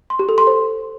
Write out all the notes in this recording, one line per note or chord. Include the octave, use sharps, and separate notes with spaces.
C6
G4
A4
C6
C5